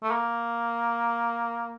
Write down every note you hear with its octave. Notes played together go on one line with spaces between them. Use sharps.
A3
A#3